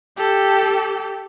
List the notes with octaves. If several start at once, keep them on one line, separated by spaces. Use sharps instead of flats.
G4 A4